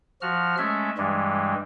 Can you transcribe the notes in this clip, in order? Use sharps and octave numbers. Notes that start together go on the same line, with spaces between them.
F3 F#4 F6
G#3 A3 C#4 E5
G2 E3 G3 G#3